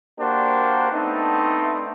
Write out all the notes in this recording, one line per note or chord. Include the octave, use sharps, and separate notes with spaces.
A#3 D4 F#4 G4 A#4 C5
A3 B3 C4 D4 D#4